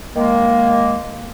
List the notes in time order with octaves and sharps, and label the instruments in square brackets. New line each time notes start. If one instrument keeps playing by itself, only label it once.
[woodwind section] D#3 G#3 A#3